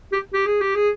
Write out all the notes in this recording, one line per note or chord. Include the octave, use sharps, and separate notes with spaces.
G4
G4
G#4
G4
G#4